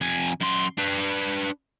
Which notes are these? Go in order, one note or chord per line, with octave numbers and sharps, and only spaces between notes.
F2 G#5
F#2 C6
D4 B4